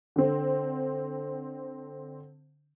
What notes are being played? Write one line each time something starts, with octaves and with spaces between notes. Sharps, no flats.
D3 C4